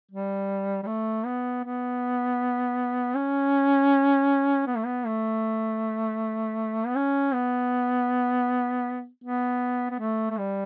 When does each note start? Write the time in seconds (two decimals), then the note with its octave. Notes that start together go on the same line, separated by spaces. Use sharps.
0.12 G3
0.83 G3
0.87 A3
1.26 B3
1.64 B3
3.15 C#4
4.67 B3
4.76 A3
4.86 B3
5.06 A3
6.86 B3
6.96 C#4
7.33 B3
9.24 B3
9.91 B3
10.00 A3
10.31 A3
10.38 G3